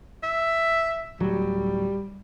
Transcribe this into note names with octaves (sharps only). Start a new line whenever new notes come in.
E5
D1 F#3 G3